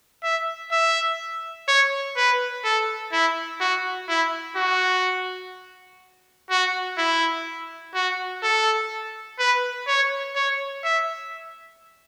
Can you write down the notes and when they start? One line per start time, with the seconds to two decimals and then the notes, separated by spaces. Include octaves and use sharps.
0.23 E5
0.72 E5
1.68 C#5
2.17 B4
2.64 A4
3.12 E4
3.61 F#4
4.09 E4
4.57 F#4
6.50 F#4
6.98 E4
7.95 F#4
8.43 A4
9.39 B4
9.87 C#5
10.35 C#5
10.84 E5